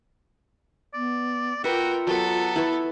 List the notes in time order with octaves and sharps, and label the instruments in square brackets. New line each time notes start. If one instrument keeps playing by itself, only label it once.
[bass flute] B3 [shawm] D5
[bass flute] F4 [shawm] F#4 [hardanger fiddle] A#4 G5 [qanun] B4 E5
[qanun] F#3 [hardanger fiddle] B3 A4 [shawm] A5
[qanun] E4 B4 C#6